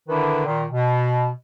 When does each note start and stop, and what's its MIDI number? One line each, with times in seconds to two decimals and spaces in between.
0.08 0.45 50
0.08 0.45 51
0.08 0.45 62
0.08 0.45 64
0.08 0.45 71
0.45 0.64 46
0.45 0.64 51
0.71 1.27 47